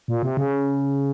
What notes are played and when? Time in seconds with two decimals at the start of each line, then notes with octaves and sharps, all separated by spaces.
0.08 A#2
0.23 C3
0.37 C#3